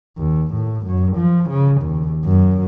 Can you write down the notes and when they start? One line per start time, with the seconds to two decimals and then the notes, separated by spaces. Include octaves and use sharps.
0.17 D#2
0.54 A2
0.86 F#2
1.17 F3
1.50 C#3
1.81 D#2
2.25 F#2